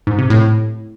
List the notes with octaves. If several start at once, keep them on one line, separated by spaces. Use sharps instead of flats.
G#2
C3
A2